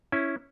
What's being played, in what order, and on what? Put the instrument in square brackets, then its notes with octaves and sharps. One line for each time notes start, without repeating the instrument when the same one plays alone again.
[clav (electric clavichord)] C#4 E4